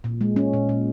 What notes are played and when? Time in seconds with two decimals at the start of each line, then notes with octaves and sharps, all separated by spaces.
0.04 A#2
0.21 G#3
0.36 C#4
0.53 A#2
0.69 A#2